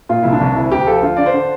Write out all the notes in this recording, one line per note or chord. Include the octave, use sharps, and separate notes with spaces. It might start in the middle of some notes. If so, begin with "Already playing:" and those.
A#2 F4
C2 E4
D4
C2
D2 E4
D2 G4
F3 A4
D3 F4
D3 D5
C5
D3